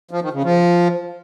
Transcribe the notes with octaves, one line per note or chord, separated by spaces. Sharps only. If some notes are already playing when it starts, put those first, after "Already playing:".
F3
D#3
C#3
F3